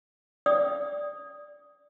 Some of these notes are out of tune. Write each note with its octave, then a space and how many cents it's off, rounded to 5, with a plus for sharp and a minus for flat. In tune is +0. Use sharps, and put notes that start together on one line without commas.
D5 +0 D#6 +0